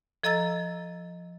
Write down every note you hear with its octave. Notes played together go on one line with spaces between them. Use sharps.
F3 A4 D#5 A#5 E6 A6